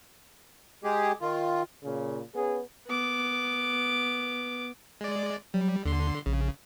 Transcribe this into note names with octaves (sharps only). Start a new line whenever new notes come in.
G#3 G4 G#4
D#3 F4
A#2 C#3
B3 C#4 G#4
B3 D6
G#3 D5
F#3 G3
D#2 D3 C6
A#1 C#3